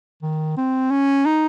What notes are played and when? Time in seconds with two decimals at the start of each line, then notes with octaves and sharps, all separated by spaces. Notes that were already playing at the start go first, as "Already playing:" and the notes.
0.23 D#3
0.57 C4
0.91 C#4
1.26 D#4